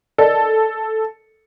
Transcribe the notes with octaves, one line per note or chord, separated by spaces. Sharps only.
A4 A#4 D5 D#5